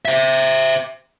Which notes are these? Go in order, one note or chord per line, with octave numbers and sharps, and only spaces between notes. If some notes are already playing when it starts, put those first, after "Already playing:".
C5 E5